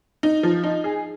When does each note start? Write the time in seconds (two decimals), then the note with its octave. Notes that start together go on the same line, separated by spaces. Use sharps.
0.23 D#4
0.43 F3
0.64 D#4
0.84 G#4